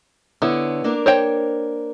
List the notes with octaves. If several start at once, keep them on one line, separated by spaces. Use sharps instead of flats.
D3 B3 E4 C#5
A#3 D4 A#4
C5 C#5 G5